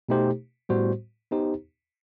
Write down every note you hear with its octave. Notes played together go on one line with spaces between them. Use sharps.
B2 A3 D#4 G4 C5
A2 G3 B3 F#4 C5
B3 D#4 G4 C5